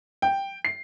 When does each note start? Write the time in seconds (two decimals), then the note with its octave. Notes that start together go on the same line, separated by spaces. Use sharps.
0.22 G5
0.65 C7